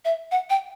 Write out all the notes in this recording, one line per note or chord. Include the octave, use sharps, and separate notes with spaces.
E5
F#5
G5